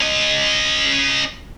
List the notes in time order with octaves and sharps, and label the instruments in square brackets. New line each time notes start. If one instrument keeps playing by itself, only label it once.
[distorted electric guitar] C#4 D#5